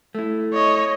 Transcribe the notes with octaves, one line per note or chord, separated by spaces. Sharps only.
A3 E4
C#5 D#5